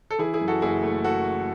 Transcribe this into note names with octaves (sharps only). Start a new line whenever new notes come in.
A4
E3 E4 G#4
E4 G#4
F#2
F#4 A4
F#1 E4 G#4
A3
F#4 A4